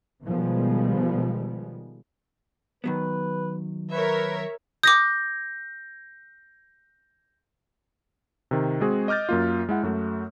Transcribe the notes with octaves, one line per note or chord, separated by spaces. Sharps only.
B2 D#3 F3 G3 G#3 B3
D#3 F#3 B3 B4
A#4 B4 C#5 E5
D6 D#6 G6 A#6
C3 D#3
G#3 C4 F#4 G#4
D#5 D6 F6 G6 A6
F#2 A#3 F4
G#3 E4 F#5
F#2 A3 F#4